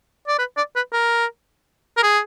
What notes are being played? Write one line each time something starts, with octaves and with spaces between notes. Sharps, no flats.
D5
B4
D5
B4
A#4
A#4
G#4